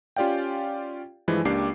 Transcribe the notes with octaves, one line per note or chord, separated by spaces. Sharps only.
C#4 F4 G4 D5 F5 G5
G2 E3 F3 G#3 E4
C#2 A#3 D4 G4 D6 C7